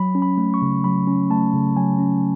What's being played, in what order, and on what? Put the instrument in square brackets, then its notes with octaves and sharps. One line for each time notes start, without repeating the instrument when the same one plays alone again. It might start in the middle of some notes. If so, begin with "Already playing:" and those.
Already playing: [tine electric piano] F#3 B5
C#4
B5
A3
C#6
C#3
F#3 B5
C#4
A3 A5
C#3
F#3 G#5
C#4